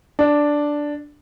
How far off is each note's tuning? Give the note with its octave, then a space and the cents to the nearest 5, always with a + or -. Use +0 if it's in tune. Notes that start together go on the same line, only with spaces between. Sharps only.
D4 +0